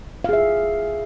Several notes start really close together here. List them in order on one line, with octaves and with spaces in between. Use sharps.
F5 G#4 E5